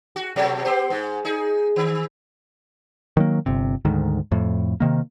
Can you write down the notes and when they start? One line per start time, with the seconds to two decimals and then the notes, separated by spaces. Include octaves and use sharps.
0.16 F#4
0.36 B2 F#3 A3
0.65 B3 G4 C5
0.90 G#2
1.25 D#4 G#4
1.76 D#3
3.17 D#3 F#3 A#3
3.46 G1 C3
3.85 D2 G#2 D#3
4.32 F2 A2
4.80 C3 D#3 A#3